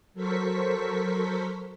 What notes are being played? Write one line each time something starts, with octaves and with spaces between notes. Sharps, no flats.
F#3 A4 A#4 C5 C#6 B6